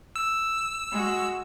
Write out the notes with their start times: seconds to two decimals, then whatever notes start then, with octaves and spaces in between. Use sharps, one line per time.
0.16 E6
0.92 G#3 F#4